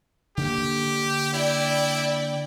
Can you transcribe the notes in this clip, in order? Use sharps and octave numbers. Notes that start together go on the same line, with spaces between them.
D3 A#3 G4
E4 D5 G5